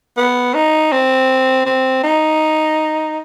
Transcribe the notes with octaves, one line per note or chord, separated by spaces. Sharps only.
B3
D#4
C4
C4
D#4